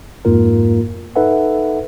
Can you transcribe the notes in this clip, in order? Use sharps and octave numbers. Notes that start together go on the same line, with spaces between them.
F2 G#2 A#3 F4 A#4
D#4 A4 B4 E5 F#5